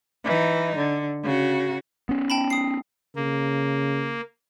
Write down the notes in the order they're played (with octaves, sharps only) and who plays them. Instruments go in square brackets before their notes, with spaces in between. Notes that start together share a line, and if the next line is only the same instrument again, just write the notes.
[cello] E3 D#4
D3
C#3 F#4
[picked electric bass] B3 C#4
[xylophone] G5 A5 B5
D#6 C7
[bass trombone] C#3 [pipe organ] A#3